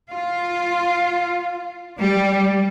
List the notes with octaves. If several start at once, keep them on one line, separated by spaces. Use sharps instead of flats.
F4
G3